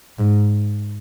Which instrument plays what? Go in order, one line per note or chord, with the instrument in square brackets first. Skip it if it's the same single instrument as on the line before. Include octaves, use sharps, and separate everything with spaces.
[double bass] G#2